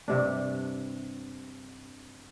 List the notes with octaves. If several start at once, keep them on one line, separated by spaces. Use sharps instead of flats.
G2 C3 D4